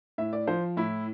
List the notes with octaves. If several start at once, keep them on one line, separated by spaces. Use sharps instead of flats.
A2 E5
D5
F3 C5
A2 E4